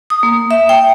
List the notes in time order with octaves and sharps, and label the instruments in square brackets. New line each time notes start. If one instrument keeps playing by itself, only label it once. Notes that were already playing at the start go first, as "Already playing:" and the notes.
[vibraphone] D#6
A#3
E5
G5